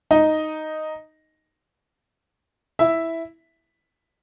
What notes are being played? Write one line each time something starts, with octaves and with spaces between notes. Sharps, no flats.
D#4 D#5
E4 E5